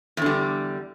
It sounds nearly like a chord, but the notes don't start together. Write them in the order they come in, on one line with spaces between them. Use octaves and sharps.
E2 D3 G3